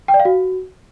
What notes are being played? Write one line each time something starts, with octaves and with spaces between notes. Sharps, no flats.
G5
D5
F5
F#4